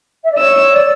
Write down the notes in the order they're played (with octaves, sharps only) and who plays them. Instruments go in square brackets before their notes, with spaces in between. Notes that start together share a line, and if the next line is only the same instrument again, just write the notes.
[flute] E5
D5
[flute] C#5 [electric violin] E6
[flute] D5